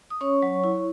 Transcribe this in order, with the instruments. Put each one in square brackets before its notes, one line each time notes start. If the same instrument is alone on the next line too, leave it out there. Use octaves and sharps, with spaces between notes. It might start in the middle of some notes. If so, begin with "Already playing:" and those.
[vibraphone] D#6
C#4 C#5 C#6
F#3
E4